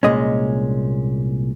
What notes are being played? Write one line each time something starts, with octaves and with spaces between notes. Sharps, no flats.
C2 A#2 G#3 C#4 D#5